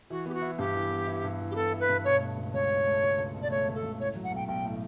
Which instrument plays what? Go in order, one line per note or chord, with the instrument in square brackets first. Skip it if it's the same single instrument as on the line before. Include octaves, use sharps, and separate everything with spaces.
[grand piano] E3 [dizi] F#4
[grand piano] B3 [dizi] G4
[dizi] F#4
[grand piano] E4
[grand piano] G2 [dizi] G4
[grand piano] E3
B3
E4
G2
E3
[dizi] G4
[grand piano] B3 [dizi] A4
[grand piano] E4
[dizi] B4
[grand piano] G2
[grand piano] B2 [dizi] C#5
[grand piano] A3
C#2
[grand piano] C#2 [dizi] C#5
[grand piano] B2
A3
C#2
C#2
B2
[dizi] D5
[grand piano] A3 [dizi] C#5
[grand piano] C#2
[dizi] A4
[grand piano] C#2
[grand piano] A2 [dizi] C#5
[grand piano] F#3
[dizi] F#5
[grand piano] B1 [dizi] G5
[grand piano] B1 [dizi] G5
[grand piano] A2